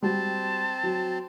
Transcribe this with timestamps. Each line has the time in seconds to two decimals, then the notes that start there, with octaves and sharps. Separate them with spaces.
0.02 G3 C4 F#4 A5
0.83 F#3